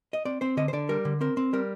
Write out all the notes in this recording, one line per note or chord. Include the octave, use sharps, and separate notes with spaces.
D#5
C4 D5
C4 C5
D3 D#5
C5
D3 D5
G3 A#4
D3
C4 A#4
C4
G3 A#4